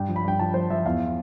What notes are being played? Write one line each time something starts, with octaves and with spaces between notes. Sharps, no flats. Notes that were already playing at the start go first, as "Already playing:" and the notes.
Already playing: G2 G5
F3
B5
G2 G5
F3 A5
F3 C5
F3 E5
E2 F5